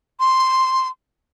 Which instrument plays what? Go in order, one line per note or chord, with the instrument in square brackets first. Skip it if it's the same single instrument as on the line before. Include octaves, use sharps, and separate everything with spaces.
[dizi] C6